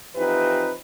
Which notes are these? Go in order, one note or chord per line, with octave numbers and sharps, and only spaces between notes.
E3 F3 C4 D#4 G4 B4